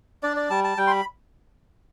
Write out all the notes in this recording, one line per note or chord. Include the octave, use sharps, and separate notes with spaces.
D4 D5
D5
G3 A5
A5
G3 G5
C6
B5